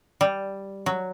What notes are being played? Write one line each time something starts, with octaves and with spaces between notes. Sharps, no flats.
G3
F#3